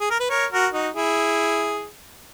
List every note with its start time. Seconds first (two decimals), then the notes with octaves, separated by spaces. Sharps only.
0.01 G#4
0.11 A#4
0.20 B4
0.30 A#4 C#5
0.52 F#4 A#4
0.73 D#4 F#4
0.95 E4 G#4